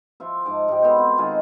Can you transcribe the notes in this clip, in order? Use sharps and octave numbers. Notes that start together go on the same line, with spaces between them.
F3 F4 E5
G#2 A5 D6
G#2 G4
B3 F#4 A4 C5
C4 C5
D#3 G#3 F4 G#4